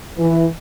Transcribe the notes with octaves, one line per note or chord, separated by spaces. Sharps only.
E3